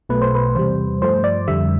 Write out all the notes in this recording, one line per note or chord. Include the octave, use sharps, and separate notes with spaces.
B1 B2 A3 B4
C5
B4
E2 C3 G3 C5
G2 F3 A3 C5
D5
F2 D3 G3 E5